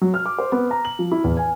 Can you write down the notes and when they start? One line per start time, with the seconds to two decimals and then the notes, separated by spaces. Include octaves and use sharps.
0.01 F#3
0.14 F6
0.26 D6
0.38 C5
0.52 B3
0.71 A#5
0.85 F#7
0.99 F3
1.12 E4
1.24 E2
1.37 G#5